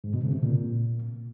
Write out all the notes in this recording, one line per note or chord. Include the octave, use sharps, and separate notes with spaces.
G#2
B2
C#3
C3
A#2